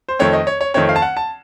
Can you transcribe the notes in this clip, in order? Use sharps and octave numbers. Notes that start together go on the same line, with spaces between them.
C5
F2 D#3 A3 C4 C#5
D#5
C#5
C#5
F2 D#3 A3 C4 C#5
F5
A5
F#5
A5